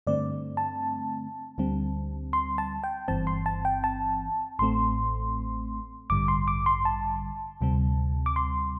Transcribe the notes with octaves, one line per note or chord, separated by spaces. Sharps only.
G2 D3 A3 C4 D5
A5
D2 D3 G3 C4
C6
A5
G5
G1 G2 E3 C4 A5
C6
A5
G5
A5
A1 A2 A3 C4 C6
A1 G2 D3 G3 D6
C6
D6
C6
A5
D2 C3 G3 C4
D6
C6